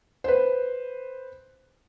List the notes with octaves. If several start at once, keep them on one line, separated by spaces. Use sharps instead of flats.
B4 C5